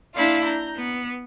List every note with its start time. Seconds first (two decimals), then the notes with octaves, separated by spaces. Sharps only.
0.14 A#3 D4 E4 F4 F5
0.43 A#5 G6
0.77 B3